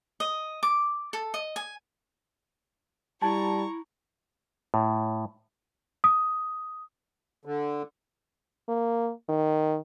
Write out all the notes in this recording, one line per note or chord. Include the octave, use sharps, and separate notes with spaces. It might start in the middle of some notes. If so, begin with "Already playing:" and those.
D#5
D6
A4
D#5
G#5
G3 E4 A5 A#5 C#6
A2
D#6
D3
A#3
D#3